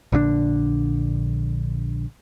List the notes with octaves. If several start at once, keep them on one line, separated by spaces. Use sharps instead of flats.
A#1 D3 E3 D4